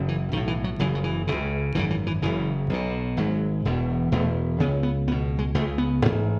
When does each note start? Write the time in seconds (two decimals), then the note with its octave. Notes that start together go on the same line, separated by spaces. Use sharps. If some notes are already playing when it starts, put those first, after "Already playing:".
Already playing: F#1 F#2 C#3
0.08 E3
0.32 B1 D#3
0.37 A2
0.47 E3
0.64 F#3
0.79 F#1 F#2 C#3 E3
0.95 F#3
1.04 E3
1.27 C#2 C#3
1.75 G#1 F#2 C#3 E3
1.90 E3
2.07 E3
2.22 F#1 F#2 C#3 E3
2.70 B1 B2
3.17 G#1 G#2 F#3
3.65 E1 E2 B2
4.12 E1 E2 B2 A3
4.60 C#2 C#3 B3
4.83 B3
5.08 C#2 B3
5.11 B2
5.39 G#3
5.55 C#2 C#3 A3
5.78 B3
6.03 A1 G#2